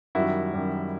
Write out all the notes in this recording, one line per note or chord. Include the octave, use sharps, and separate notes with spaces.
F#2 D#3 G3 E4 F#4
F#2 D#3 G3